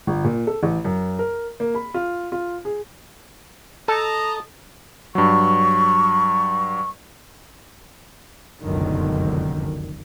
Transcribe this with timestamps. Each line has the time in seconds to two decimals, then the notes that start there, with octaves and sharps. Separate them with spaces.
0.07 G1
0.24 A#2
0.47 A4
0.63 A1
0.85 F#2
1.19 A#4
1.60 A#3
1.75 B5
1.94 F4
2.32 F4
2.65 G#4
3.88 A4 D#5 A5 A#5
5.15 G2 F#3 C#6
8.61 F1 C#2 F#2 B2 D3 D#3